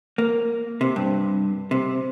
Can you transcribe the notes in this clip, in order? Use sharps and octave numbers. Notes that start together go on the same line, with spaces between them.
A#3
C3
G2
C3